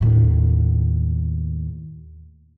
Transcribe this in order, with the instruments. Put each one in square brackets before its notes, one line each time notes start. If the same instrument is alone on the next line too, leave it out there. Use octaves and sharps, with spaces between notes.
[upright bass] D#2 A2